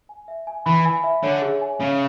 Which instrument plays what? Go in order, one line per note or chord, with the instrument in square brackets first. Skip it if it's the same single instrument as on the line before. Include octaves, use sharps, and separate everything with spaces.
[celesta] G#5
E5
G#5
[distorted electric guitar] E3 [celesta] B5
[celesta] G#5
E5
[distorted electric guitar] D3 [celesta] C#5
[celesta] G#4
G#5
[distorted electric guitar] C#3 [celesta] C#5